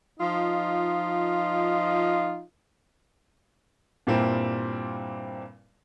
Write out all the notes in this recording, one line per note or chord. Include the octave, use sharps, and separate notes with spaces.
F3 D#4 F4 D#5
G2 A#2 G3 A#3 C4 E4